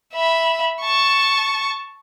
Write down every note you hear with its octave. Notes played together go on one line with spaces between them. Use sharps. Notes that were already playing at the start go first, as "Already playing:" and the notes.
E5 B5
A5 C#6